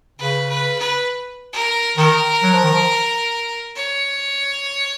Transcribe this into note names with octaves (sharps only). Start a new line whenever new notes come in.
C#3 B4
B4
B4
A#4
D#3 A#4
F#3
F3
D#3
F3
C#5